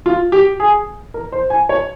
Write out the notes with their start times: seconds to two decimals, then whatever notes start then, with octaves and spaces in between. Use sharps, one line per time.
0.06 F4
0.32 G4
0.60 G#4
1.14 A#4
1.32 C5
1.50 G#5
1.69 C#5